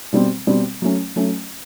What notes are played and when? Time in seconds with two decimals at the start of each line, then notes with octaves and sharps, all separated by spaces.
0.13 B2 G3 C4
0.47 B2 G3 C4
0.82 F#3 A3 C#4
1.16 F#3 A3 C#4